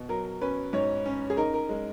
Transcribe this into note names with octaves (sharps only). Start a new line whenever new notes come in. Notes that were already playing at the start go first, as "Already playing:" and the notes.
Already playing: B2
F#3 A#4
C#4 B4
G#2 C#5
C#4
G#4
D#4 A#4
A#4
G#3